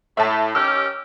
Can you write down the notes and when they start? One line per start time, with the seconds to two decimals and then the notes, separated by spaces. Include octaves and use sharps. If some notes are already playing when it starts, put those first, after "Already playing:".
0.17 A2 E5 A5
0.55 D#3 C#4 G4 E6 F6